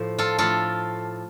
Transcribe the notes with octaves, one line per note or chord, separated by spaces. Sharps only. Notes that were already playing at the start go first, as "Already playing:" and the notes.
Already playing: A2 F3 C5
F4 A4
A2 F3 F4 A4